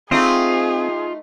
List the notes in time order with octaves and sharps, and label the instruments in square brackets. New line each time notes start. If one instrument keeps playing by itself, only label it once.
[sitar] A3 D#4 D#5 [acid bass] C4 [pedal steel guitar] F4 [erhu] G#4